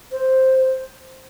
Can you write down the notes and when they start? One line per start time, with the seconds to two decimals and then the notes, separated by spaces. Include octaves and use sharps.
0.12 C5